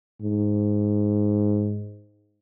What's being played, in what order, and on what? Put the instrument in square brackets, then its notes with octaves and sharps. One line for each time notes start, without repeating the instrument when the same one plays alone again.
[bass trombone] G#2